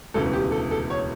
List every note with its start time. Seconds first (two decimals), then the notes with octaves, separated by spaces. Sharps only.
0.14 E1 D2 C#3 E3 A4
0.33 G4
0.52 A4
0.71 A4
0.90 C#5